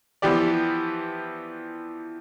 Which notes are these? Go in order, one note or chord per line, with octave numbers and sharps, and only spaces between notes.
E3 F3 B3 G4 D5